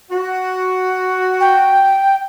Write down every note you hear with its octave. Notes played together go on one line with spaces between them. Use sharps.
F#4
G5